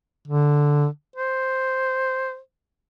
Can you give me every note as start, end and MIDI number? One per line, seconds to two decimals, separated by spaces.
0.28 0.86 50
1.16 2.39 72